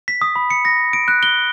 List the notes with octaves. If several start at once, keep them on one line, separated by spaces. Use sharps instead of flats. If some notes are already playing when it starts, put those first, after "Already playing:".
B6
D#6
B5
C#7
A#6
D7
F#6
G7